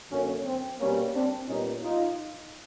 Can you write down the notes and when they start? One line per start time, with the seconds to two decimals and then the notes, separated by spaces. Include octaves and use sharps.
0.11 F#2 D3 F#3 A#3 C#4
0.45 C4
0.80 B2 G3 A#3 C#4
1.14 C4 D4
1.48 A#2 G3 B3 C#4 D#4
1.82 D#4 F4